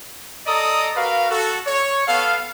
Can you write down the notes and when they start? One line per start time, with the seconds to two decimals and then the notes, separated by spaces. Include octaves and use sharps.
0.46 A4 D5 D#5 A#5 D#6
0.96 F#4 A#4 B4 F5
1.29 F#4 A4
1.66 C#5
2.07 B3 A4 F5